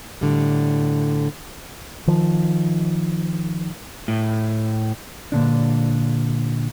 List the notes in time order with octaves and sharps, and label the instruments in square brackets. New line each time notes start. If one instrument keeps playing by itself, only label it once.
[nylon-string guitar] A2 D3 G3
[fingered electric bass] D#3 F3
[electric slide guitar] A2
[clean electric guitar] A#2 D3 D4